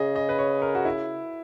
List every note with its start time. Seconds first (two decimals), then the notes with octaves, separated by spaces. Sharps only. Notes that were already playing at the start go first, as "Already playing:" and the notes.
Already playing: C#3 G#4 D#5
0.16 D#5
0.29 B4
0.38 C#5
0.62 A#4
0.75 F#4
0.85 E4